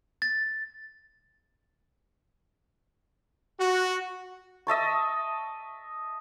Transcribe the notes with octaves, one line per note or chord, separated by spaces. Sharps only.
A6
F#4
D#5 E5 A5 C#6